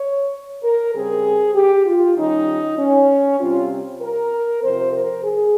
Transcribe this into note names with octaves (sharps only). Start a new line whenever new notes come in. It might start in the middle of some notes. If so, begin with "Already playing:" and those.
Already playing: C#5
A#4
C#3 G3 C4 G#4
G4
F4
D#3 G3 C#4 D#4
C#4
C3 G3 C4 F4
A#4
C3 F3 C4 C5
A#4
G#4